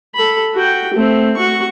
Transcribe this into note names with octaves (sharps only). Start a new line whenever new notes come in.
A4 B5
F#4 G5
A3 C4
F#4 C#6